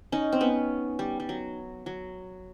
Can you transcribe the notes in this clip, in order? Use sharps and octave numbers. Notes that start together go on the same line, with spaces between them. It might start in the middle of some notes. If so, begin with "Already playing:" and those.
C#4 D#4
C4
B3 C#4
G3
G3
F#3
F#3